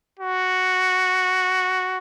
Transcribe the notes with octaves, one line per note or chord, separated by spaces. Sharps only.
F#4